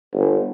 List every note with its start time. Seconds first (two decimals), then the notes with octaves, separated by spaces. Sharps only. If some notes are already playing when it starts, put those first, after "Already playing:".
0.13 G1